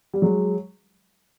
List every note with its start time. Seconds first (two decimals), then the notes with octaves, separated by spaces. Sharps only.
0.14 G3
0.22 F#3 G#3